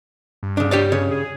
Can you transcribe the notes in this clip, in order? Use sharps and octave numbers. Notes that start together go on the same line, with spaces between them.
G2
C#3 D4
G4 C#5 D5
C#3 C#5
G#4